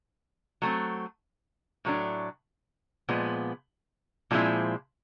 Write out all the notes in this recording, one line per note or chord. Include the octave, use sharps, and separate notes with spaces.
F#3 A3 C4
A2 F#3 A3 D4
A#2 F3 G#3 B3
A#2 F3 G#3 C4 E4